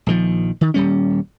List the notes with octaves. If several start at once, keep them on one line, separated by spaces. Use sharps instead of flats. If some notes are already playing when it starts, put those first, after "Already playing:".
A#1 D#3 F3
D#3
D#1 G3 C#4